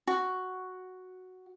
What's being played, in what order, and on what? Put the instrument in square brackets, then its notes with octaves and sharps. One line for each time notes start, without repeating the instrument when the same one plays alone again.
[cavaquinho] F#4